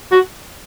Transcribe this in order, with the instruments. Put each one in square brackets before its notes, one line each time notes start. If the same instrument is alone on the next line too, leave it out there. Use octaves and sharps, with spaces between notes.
[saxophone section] F#4